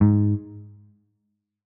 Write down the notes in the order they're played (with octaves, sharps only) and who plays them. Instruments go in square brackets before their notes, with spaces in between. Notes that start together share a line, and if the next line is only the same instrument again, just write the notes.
[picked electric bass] G#2